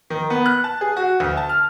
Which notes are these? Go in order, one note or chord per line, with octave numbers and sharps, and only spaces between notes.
D#3
B3
F#6
A5
G#4
F#4
D2
A5
F6